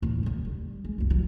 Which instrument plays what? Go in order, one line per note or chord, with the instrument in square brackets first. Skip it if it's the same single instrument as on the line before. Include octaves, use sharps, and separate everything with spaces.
[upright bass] E2 A2
D#1 D3
G3
G#3
C2 F2
F3 F#3